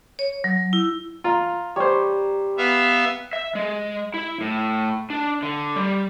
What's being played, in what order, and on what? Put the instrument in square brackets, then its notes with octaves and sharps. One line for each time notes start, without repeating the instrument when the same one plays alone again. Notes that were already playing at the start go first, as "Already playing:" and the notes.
[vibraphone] C#5
F#3
E4
[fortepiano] F4 [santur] A#5
[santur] G3 [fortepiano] C5 C#5
[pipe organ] B3 E5 F5
[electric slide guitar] E5
G#3
E4
A2
D4
D3
G3